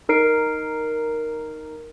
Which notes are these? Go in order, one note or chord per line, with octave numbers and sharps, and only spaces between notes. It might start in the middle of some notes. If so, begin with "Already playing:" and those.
D#4 A#4 C7 D7